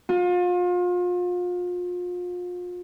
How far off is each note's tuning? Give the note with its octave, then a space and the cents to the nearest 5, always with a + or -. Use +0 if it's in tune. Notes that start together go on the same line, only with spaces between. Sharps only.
F4 +35